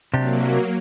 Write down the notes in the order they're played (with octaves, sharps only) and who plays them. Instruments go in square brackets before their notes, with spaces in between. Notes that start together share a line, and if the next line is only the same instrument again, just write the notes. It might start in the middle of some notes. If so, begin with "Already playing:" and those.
[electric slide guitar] C3 D4 G4 [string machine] F#3 A#3